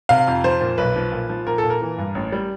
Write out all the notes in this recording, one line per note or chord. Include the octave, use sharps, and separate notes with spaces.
C3 F5
F2
F3 C5
A#2
B1 B4
F3
A#2
F3
A#2 A#4
A4
A#2
A#4
E3
G2
A1
G3